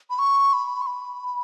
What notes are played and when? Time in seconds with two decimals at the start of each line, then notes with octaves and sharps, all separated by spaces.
0.10 B5
0.19 C#6
0.53 B5
0.81 C#6
0.87 B5